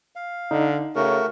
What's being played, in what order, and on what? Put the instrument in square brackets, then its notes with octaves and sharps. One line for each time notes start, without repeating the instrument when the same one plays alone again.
[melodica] F5
[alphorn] D3 [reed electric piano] D#4
[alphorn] C#3 [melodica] A3 F#4 A#4